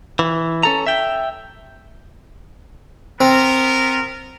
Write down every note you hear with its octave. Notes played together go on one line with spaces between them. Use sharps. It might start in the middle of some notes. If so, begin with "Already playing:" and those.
E3
C#4 A4 A#5
E5 G5
B3 C4 A#4